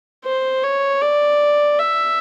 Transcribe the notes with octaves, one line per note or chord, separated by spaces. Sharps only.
C5
C#5
D5
E5